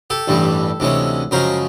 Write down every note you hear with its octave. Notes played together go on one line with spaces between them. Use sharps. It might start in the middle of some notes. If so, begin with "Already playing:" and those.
G4 A4
A1 G2 E3 G3
D2 C3 E3 G#3 C#4
F#2 C#3 F3 G#3 A#4 C5